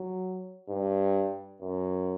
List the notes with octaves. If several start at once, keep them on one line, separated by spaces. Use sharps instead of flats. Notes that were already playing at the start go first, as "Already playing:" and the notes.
Already playing: F#3
G2
F#2